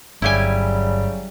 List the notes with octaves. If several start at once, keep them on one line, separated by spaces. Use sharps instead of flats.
G1 C#3 F#3 G3 E4 G4 G#5